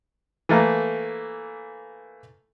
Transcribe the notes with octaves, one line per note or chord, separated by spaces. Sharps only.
E3 A3 A#3